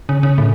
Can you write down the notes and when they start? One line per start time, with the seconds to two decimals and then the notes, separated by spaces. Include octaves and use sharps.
0.09 C#3
0.23 C#3
0.38 A2